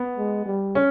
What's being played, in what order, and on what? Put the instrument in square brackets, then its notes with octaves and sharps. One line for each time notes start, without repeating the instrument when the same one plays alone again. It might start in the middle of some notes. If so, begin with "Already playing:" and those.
Already playing: [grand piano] B3
[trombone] G#3
G3
[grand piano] C#4